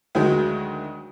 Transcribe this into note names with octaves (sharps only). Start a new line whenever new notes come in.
D2 D#3 F#3 G#3